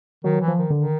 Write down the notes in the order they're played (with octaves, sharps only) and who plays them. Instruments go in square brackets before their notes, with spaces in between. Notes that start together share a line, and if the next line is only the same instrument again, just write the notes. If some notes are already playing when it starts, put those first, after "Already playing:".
[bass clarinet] D#3 [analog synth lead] F#3
[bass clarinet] E3
[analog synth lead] F3
[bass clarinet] D#3
[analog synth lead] D3
[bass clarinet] D#3